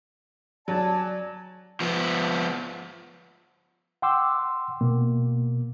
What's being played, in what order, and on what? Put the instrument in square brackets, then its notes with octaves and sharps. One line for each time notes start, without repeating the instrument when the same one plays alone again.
[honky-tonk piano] F#3 [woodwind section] D5 G#5 A5
[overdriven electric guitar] F3 B3
[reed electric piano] F#5 G5 C6 D6 E6
B2 A#3